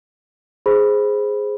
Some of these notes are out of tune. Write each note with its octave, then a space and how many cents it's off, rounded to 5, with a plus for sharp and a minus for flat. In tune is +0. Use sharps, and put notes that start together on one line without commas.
G#4 +0 C5 +0 B5 -5